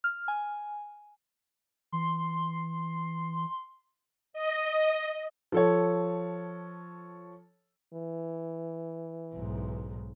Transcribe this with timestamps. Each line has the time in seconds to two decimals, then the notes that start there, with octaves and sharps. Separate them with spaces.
0.04 F6
0.28 G#5
1.92 E3 C6
4.33 D#5
5.52 F3 A4 C#5
7.94 E3
9.35 B1 G#2